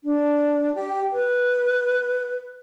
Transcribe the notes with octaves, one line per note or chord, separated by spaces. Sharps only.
D4
G4
B4